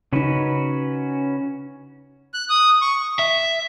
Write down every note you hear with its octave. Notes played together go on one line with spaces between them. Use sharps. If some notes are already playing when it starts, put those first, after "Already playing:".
C#3 C#4 D#4 F#4 B4
F#6
D#6
C#6
E5